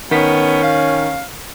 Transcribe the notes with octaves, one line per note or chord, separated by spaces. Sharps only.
D#3 B3 C#4 B6
F5